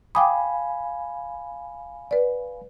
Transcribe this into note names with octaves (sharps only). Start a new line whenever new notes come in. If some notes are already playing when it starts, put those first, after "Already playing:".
F5 G5 G#5 B5 D6 D#6
B4 D5